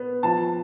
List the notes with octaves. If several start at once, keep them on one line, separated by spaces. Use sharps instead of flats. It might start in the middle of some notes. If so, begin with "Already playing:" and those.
Already playing: B3
F3 A5